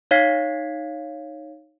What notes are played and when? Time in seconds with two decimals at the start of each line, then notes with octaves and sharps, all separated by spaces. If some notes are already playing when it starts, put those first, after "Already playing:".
0.11 D#4 C#5 F5 G#6 B6 C7